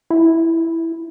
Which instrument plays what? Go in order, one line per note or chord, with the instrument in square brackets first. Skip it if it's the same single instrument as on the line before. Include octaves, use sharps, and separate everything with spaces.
[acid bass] E4